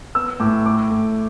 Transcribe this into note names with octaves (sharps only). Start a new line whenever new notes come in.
B3 E6
A2 D6
A3 D6
A2